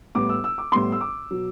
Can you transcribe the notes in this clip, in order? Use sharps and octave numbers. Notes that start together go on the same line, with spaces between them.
A2 G3 B3 D6
E6
E6
D6
A2 G3 B3 C6
E6
D6
B2 F#3 B3